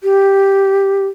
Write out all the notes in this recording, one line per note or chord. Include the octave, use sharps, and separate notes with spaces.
G4